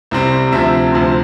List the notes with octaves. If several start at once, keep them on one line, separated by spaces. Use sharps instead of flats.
C2 C3 G3 C4
D2 C3 F3 C4 E5
D2 C3 F3 C4